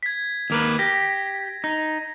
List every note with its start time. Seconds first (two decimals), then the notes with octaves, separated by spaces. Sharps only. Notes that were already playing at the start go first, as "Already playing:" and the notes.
0.03 G#6 B6
0.50 D#2 A#3 B4
0.79 G4 A#6
1.64 D#4